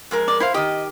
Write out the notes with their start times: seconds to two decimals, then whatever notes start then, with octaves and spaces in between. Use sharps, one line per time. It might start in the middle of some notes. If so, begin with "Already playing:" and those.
0.11 F2 G#3 A#4
0.28 D5
0.40 E4 C5 F5
0.54 D#3 G4 D#5